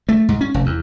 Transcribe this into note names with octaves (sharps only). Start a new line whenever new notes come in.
A3
G#2
C#4
F1
E2